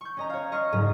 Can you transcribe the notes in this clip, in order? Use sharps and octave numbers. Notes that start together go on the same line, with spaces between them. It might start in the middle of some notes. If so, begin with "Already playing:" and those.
C#6 G6
C#4 D#5 A#5
C#5 F5
D#5 C#6 F6 C7
F#1 G#2 A#5 D#7